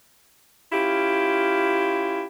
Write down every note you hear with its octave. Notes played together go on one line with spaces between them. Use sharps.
C#4 E4 F4 G4